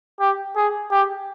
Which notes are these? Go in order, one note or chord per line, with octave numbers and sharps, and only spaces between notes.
G4
G#4
G4